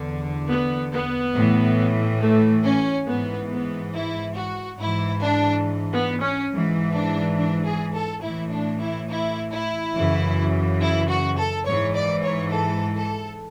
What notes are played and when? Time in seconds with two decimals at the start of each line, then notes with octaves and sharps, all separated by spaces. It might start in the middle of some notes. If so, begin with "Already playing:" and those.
Already playing: E2 D3
0.48 B3
0.92 B3
1.34 A2 E3
2.20 A3
2.63 C#4
3.06 G#2 E3 B3
3.50 B3
3.93 E4
4.35 F#4
4.78 G#2 E3 E4
5.22 D4
5.93 B3
6.22 C#4
6.51 G#2 E3
6.93 D4
7.37 D4
7.65 G#4
7.94 A4
8.22 A2 E3 E4
8.52 D4
8.80 E4
9.09 E4
9.52 E4
9.95 F#2 C#3 E3
10.81 E4
11.09 F#4
11.38 A4
11.66 G#2 E3 C#5
11.95 D5
12.24 C#5
12.52 A4
12.96 A4